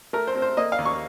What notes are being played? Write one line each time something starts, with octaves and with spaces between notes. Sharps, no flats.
A3 A#4
C5
C4
C5
A#3 D#5
F5
D#2
C#6